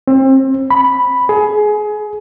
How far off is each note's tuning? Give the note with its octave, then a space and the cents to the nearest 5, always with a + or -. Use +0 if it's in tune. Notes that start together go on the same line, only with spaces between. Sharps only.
C4 +30
B5 +0
G#4 +25